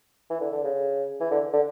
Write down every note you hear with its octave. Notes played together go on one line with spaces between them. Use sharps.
E3
D3
D3
C#3
E3
D3
D3